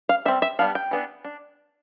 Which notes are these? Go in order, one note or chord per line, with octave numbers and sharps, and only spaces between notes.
F5
G3 C4 E5
E5
G3 B3 D4 F5
G5
E3 B3 D4
D4